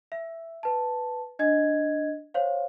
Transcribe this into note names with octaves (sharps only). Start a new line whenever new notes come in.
E5
B4 A5
D4 D#5 G#6
C5 C#5 F5